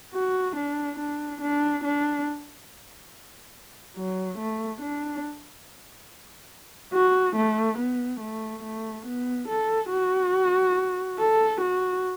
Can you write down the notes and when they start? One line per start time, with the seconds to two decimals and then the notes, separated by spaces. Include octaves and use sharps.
0.14 F#4
0.56 D4
0.99 D4
1.41 D4
1.84 D4
3.96 F#3
4.38 A3
4.81 D4
6.94 F#4
7.36 A3
7.78 B3
8.21 A3
8.63 A3
9.06 B3
9.48 A4
9.91 F#4
11.19 A4
11.61 F#4